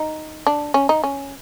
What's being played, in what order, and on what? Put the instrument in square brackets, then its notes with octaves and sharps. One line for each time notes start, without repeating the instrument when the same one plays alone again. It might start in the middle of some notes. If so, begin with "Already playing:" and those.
Already playing: [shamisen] D#4
D4
C#4
D#4
C#4